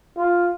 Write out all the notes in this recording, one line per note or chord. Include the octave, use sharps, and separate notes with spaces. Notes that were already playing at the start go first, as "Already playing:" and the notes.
F4